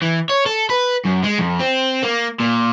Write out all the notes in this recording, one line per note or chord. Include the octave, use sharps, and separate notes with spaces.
E3
C#5
A4
B4
F#2
G#3
F2
C4
A#3
A#2